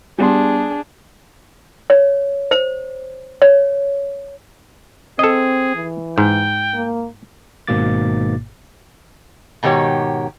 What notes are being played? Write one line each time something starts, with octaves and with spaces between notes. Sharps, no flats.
G3 B3 D4 G#4 C6
C#5
C5
C#5
C4 G#4 A4 D#5
E3
G#2 G5
A#3
G#1 G#2 B2 A#3 D6 A6
G#2 B2 D#3 G4 C#5